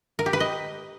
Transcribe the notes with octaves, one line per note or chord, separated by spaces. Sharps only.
A#4
G4
B4
D#5